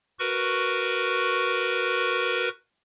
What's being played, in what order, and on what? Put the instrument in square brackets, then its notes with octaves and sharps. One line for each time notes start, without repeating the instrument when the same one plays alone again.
[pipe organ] F#4 A#4 B4 C#6